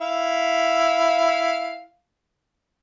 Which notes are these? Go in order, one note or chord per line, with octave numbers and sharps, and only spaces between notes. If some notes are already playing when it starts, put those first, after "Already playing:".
E4 F5